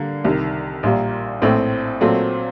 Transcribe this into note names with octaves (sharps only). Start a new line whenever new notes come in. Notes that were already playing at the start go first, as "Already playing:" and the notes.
Already playing: D3 G3 A#3
C2 C3 D#3
A#1 A#2 G3 A#3
A#1 A2 A3 C4
A#2 F#3 A3 C4